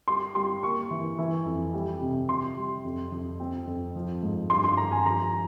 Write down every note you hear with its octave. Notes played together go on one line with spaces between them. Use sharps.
G3 C6
G3 C6
A#3 C#6
E3
E3
F2
G3
C3
C3 C6
G3
F2
F2
C4
F2
F3
G#2
G2 C6
C6
G2 A#5
G#5
F3 A#5